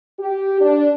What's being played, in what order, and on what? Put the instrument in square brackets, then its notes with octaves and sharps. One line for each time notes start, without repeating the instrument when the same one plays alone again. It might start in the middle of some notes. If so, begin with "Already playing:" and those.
[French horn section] G4
D4